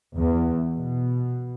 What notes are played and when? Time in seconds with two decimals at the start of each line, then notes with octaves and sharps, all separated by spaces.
0.15 E2
0.74 B2